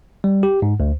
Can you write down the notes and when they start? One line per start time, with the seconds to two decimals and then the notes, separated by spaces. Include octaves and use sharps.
0.24 G3
0.43 G4
0.62 G#2
0.80 D2